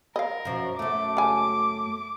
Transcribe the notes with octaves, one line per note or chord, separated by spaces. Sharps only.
A#4 D#5 F5
F#2 F3
F#2 A3 D6
C#3 G#5